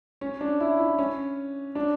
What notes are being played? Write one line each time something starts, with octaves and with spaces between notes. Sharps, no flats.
C#4
D4
E4
E4
C#4
D4